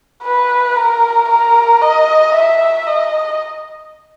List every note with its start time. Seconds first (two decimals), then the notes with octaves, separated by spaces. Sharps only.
0.24 B4
0.76 A#4
1.29 A#4
1.81 D#5
2.34 E5
2.86 D#5